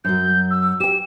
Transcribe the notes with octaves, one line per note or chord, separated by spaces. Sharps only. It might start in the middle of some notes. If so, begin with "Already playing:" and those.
F#2 F#3 G6
E6
G4 G5 E7